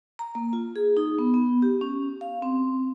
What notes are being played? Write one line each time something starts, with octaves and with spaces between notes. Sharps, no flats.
A#5
A#3
F4
G#4
D#4
B3
B3
G4
C#4
F5
C4